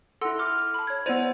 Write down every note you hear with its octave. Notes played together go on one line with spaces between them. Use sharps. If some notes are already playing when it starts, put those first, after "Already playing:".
E4 A4 F#5 C6 E6
C6 D6 F6
A5 B5
C#5 G#6
B3 E4 C5 D5 D#7 F7